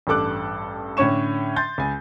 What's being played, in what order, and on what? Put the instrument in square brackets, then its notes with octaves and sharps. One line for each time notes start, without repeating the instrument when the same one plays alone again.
[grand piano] A1 G2 A4 D6 F#6
A2 D3 C#4 C#5 C#6 E7
C6 G6 A6
C#2 G#5